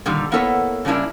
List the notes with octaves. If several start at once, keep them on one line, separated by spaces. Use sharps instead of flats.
A#2 D3 D#3 G3
A#3 B3 E4 A4 B4 C#5
C#3 G3 A#3 D4 E4